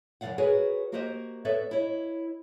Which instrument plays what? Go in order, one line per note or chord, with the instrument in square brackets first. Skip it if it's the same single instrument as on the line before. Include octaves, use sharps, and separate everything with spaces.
[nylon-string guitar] F#2 C#3 E3 D5 F5 F#5
F#4 G#4 A#4 B4 C#5 G#5
A#3 F#4 G4 A#4 C5 D#5
B3 A4 B4 C#5 D5 E5
E4 C#5 D#5